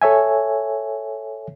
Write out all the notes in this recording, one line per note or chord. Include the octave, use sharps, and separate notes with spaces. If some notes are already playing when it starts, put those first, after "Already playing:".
A4 C#5 E5 G#5